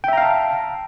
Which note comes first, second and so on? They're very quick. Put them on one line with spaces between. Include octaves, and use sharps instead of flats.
G5 E5 A#5 F5 A5